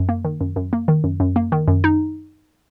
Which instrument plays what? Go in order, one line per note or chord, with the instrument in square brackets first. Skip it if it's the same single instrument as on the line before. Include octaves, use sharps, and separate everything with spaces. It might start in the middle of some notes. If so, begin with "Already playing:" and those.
Already playing: [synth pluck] F#2
A#3
D#3
F#2
F#2
A#3
D#3
F#2
F#2
A#3
D#3
F#2
D#4